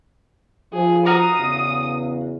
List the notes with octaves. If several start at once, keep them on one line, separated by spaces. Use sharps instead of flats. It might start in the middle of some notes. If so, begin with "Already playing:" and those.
F3 G#4
F#4 F5 A#5 D#6
E2 C#3